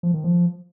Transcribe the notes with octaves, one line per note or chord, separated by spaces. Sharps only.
F3
D#3
F3